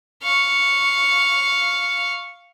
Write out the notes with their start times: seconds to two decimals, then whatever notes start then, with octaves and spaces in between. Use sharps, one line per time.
0.23 F5 C#6